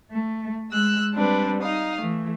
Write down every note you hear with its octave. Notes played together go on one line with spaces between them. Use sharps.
A3
G#3 E6 F#6
G3 C4 D4 B4
D#4 F5 D#6
E3 A3